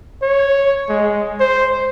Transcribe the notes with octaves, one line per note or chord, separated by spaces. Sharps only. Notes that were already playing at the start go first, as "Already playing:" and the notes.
C#5
G#3
C5